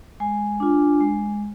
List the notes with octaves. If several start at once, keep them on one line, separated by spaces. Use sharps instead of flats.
G#3 G#5
D4 F4
G#3